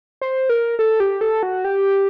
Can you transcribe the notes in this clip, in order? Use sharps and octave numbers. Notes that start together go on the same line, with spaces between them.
C5
A#4
A4
G4
A4
F#4
G4